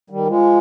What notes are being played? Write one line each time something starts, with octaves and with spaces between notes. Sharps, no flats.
D#3 G3
F3 G#3